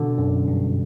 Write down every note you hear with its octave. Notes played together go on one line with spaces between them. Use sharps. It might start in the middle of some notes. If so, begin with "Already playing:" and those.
Already playing: B2 D3
F#2
G2